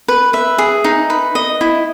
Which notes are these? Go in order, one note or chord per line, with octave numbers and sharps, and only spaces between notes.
B4
B4 E5
G#4
D#4
B4
D#5
E4